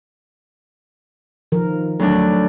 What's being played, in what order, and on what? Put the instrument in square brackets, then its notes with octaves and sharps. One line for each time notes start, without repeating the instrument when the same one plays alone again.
[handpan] D#3 F3 A#4
[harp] D2 F#3 D4